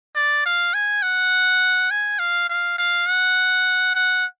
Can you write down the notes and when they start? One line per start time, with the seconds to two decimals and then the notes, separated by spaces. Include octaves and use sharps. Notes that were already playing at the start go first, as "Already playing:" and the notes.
0.16 D5
0.45 F5
0.74 G#5
1.02 F#5
1.91 G#5
2.19 F5
2.49 F5
2.78 F5
3.07 F#5
3.95 F#5